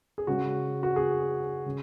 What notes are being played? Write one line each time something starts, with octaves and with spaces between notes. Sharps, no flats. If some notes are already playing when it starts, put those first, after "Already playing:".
G#4
C#3 G#3 F#4
F#4
G#4
C#3